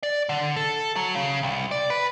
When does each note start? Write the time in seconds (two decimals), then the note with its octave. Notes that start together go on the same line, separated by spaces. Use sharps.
0.03 D5
0.29 D3
0.56 A4
0.96 F#3
1.15 C#3
1.43 C2
1.71 D5
1.90 B4